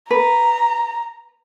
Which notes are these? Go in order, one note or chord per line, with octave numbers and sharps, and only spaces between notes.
B4 A#5